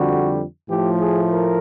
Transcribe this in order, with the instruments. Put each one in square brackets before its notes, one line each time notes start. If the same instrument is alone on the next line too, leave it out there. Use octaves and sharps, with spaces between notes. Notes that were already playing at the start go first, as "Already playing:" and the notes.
Already playing: [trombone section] F2 D3 G3 F#4
A2 F3 A3 G4
G#4
A#4